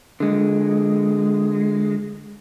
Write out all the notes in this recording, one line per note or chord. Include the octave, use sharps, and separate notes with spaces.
D3 G#3